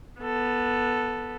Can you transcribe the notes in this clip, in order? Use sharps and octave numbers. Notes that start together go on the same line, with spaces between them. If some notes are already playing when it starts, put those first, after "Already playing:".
B3 A4